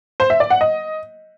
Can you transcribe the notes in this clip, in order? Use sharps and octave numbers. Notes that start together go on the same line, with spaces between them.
C5
E5
D5
F#5
D#5